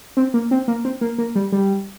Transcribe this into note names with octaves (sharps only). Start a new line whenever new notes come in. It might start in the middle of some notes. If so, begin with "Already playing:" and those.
C4
A#3
C4
A#3
C4
A#3
A#3
G3
G3